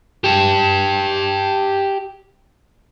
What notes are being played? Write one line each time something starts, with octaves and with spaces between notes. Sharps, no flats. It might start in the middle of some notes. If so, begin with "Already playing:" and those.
G4 A5